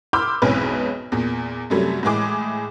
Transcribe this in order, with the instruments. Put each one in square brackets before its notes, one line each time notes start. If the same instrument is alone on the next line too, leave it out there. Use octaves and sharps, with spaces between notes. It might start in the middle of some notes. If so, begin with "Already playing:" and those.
[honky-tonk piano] B5 C6 D6 E6 F6 G6
B1 F2 G#2 E3 C#4 B4
E2 A#2
F#2 C3 F#3 G3 A3
A2 E3 G#3 G#4 D6